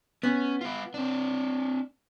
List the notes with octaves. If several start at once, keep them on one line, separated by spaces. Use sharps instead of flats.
B3 C#4
F4 B4
C4 D4